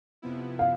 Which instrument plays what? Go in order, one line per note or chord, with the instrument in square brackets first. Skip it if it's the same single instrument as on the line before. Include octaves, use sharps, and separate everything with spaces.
[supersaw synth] F2 C3 F3 B3 E4
[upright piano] F5